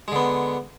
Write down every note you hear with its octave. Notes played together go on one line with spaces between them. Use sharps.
D3 G#3 B3